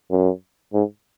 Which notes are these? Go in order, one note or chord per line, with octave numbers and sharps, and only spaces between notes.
F#2
G#2